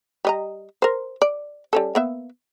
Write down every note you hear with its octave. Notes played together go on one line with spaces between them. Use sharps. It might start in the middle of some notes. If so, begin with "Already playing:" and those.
G3 D#5 A#5
A#4 C5
D5
G3 C#4 A4
A#3 B3 E5